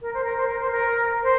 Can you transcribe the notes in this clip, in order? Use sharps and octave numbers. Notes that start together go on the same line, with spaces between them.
A#4
C5
A#4
C5
A#4
C5
A#4
C5